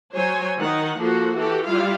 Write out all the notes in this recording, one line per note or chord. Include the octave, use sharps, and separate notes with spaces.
F#3 C5 C#5 G#5
D#3 D#4 F#5
F3 A#3 F#4 A4
E3 F#4 G4 A4
G3 E4 F4 F5